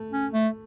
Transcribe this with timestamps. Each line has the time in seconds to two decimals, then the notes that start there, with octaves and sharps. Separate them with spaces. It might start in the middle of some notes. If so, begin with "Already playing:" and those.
Already playing: A3
0.12 C#4
0.34 A3